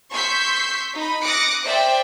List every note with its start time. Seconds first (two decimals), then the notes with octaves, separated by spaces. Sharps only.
0.12 C6 C#6 E6 G6 B6
0.96 D#4 B5
1.24 D6 D#6 F#6 A#6 C#7 D7
1.64 C5 D5 E5 G5